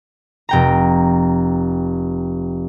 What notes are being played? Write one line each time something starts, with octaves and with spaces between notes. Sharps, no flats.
F1 G5 A#5